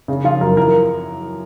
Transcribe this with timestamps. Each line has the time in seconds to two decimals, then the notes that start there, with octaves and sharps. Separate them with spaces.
0.08 C#3
0.24 F3 F4
0.41 F#2 A#4
0.57 E3 A#4